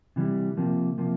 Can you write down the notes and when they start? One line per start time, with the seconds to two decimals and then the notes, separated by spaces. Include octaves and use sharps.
0.16 C3 E3 G3
0.57 C3 F3 A#3
0.98 C3 F3 A#3